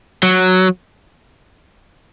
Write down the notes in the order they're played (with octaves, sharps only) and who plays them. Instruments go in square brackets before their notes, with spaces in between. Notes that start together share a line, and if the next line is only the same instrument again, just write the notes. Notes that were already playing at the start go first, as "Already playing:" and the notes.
[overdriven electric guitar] F#3